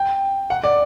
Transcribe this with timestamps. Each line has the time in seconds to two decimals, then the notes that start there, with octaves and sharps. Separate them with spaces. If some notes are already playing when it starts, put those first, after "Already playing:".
Already playing: G5
0.50 F#5
0.64 D5